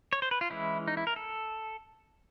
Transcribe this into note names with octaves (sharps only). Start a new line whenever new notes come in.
C#5
C5
B4
F4
E3 G#3 C#4 E4
D#4
E4
A#4
A4